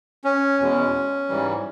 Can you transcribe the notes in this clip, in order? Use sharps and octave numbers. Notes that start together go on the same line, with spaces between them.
C#4
E2 B2 G#3
G#2 E3 G3